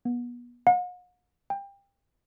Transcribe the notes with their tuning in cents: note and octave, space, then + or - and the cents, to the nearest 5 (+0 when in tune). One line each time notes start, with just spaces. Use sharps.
B3 -30
F#5 -45
G5 +25